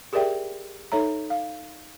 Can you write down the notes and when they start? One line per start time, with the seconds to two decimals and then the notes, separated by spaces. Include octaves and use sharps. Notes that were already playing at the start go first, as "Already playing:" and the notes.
0.13 G4 G#4 A#4 D5 E5 G5
0.92 D#4 A4 C#5 E5 A#5
1.30 F5